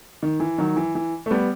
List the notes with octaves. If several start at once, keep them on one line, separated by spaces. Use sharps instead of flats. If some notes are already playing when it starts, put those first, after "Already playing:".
D#3
E3
D#3 F#3
E3
E3
A3
G3 B3